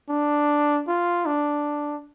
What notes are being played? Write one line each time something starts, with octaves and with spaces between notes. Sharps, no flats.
D4
F4
D4